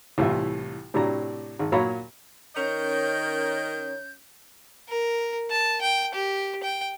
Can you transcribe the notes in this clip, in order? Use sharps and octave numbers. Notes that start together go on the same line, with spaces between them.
C2 A2 E3 G3 F4 E5
A2 C3 F#3 D4 A#5
G#1
A#2 F#3 F#4 C#5 A#5 B5
D#3 C#4 A#4 C#5 D#5 A#5 G6
A#4
A5
G5
G4
G5